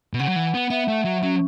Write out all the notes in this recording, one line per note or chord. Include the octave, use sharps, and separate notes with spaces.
B2
C#3 F#5
F#3
E3
B3
B3 E5
A3
F#3
F#3 C#4